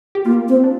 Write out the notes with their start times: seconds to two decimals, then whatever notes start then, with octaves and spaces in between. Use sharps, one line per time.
0.15 G4
0.25 A#3 F4
0.48 C4
0.64 D4